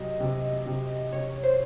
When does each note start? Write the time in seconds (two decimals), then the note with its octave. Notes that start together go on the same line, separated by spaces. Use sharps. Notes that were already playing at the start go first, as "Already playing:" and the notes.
Already playing: C3 F#3 D#5
0.20 C3
0.66 C3
1.13 C3 C#5
1.44 C5